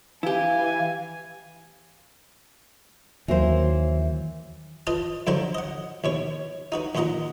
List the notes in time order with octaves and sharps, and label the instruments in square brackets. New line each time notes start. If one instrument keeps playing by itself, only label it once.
[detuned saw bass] E3 [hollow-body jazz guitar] E4 G4 [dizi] F5 [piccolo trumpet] G#5
[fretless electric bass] D#2 F#3 A#3 [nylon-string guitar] E3 C5
[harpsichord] F4 B4 D#5 F5 A5
G2 D3 F#3 F#4 C5 A#5
D#5 F#5
D#2 B2 C#5
D#4 F#4 B4
D#2 A#2 F#4 D#5 F#5 A#5